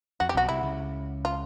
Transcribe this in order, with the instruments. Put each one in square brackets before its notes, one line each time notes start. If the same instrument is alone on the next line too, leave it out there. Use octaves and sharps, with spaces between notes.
[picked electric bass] F2 [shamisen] F#4
[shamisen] G4
[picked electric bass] B1 B2 [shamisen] F#4
[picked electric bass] C2 C3 [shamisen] E4
[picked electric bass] C#2 C#3
[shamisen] F4